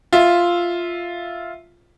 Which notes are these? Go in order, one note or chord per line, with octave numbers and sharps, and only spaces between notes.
F4 E5